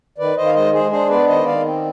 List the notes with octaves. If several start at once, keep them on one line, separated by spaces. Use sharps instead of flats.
D#3 B4 D5
D#3 C5 D#5
F5
G#3 C5 D#5
G#3 G#4 C5
D4 G#4 C5
B3 B4 D5
D#3 C5 D#5
D#3 D5 F5
C4